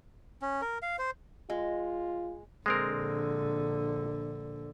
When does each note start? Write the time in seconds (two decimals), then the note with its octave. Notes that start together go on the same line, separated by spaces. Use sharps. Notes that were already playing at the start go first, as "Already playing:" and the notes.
0.42 C#4
0.62 A#4
0.82 F5
0.99 C5
1.50 G#3 F4
2.66 A#1 D3 G#3 C4 A#4